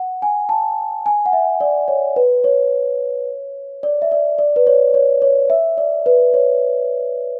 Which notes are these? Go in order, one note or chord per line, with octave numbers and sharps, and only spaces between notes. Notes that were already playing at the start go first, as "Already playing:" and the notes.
Already playing: F#5
G#5
A5
G#5
F#5
E5
D5
C#5
B4
C#5
D5
E5
D5
D5
B4
C#5
C#5
C#5
E5
D5
B4
C#5